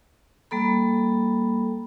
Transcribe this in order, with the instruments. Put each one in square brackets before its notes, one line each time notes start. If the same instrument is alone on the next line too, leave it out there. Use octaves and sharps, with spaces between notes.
[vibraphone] G3 A#3 A4 B5